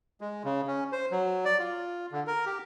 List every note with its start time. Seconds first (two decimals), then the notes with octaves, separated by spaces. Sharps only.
0.21 G#3
0.44 C#3
0.67 C#4
0.92 C5
1.12 F#3
1.45 D5
1.59 F4
2.12 D3
2.27 A#4
2.46 G4